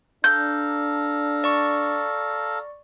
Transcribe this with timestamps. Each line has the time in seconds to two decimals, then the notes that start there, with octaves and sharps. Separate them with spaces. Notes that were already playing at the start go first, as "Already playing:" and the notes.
0.24 D4 A4 F5 A#5 G6
1.44 D5 C#6